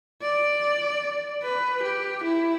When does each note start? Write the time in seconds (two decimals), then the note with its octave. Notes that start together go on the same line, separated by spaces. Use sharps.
0.22 D5
1.43 B4
1.83 G4
2.23 E4